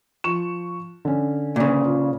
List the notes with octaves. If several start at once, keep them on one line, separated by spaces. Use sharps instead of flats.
F3 C#6 E7
D3 C#4
A#2 C#3
F4